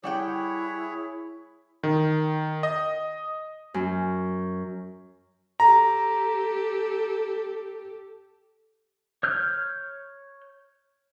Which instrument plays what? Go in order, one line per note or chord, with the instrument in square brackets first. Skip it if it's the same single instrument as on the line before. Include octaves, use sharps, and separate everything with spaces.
[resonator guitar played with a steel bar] G3 F#5 G5 [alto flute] E4 [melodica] G#4 C#5
[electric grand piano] D#3
D#5
[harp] F#2
[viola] G4 A4 [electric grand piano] A#5
[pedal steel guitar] C#5 F6 G6